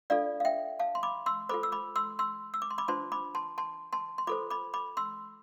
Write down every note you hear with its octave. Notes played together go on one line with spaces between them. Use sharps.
D4 F4 A4 D5 F5
F5
E5 G5
F5 A5
C6
B5 D6
C6 E6
F4 A4 C5 B5 D6
E6
B5 D6
C6 E6
C6 E6
E6
D6
C6
B5 D6
D4 F4 C5 A5 C6
B5 D6
A5 C6
A5 C6
A5 C6
C6
F4 A4 C5 B5 D6
B5 D6
B5 D6
C6 E6